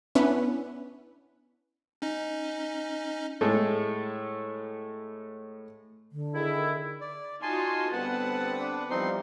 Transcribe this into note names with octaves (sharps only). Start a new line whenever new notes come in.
B3 C#4 D4 E4 B4
C#4 D#4 D#5
A2 G#3 A3
D3
D#3 E4 G#4
D5
D#4 F4 F#4 G#5 A5 C6
D3 G3 B3 C4 B4 F#5 A5
D4
E3 F3 G3 C4 D#4 C6